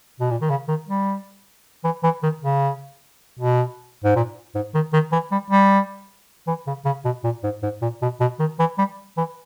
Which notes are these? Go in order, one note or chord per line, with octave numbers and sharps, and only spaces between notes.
B2
A#2
D#3
C#3
D#3
G3
E3
E3
D#3
C#3
B2
G#2
A#2
G#2
D#3
D#3
E3
G3
G3
E3
C#3
C#3
B2
A#2
G#2
G#2
A#2
B2
B2
D#3
E3
G3
E3